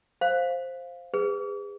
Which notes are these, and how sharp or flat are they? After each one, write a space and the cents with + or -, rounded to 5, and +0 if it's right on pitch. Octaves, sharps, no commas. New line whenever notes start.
C5 +5 F5 +0
G#4 -30 B4 +20